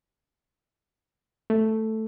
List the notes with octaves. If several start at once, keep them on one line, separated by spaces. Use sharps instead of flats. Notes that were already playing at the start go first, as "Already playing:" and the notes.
A3